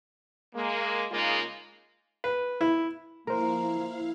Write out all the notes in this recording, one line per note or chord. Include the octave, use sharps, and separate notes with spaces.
G#3 A#3
C#3 G#3 A#3 D#4 F4
B4
E4
F3 A#3 E4 A#4 C5 F5 A#5